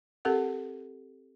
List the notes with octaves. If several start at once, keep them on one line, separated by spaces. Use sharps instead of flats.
C4 G4 A4 A#4 F#5